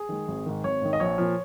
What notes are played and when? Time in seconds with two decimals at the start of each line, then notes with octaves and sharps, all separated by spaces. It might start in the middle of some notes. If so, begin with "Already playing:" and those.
Already playing: G#4
0.09 D#3 G#3
0.28 G#1
0.46 G#2 D#3
0.64 G#1 C#5
0.82 G#2 D#3
0.93 D#5
1.00 A#1 C#5
1.18 A#2 F3